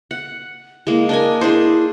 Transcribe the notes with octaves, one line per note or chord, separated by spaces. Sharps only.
F#5
G#3 A#3 E4
D4 A#4 D#5 G#5
D4 E4 G#4 C5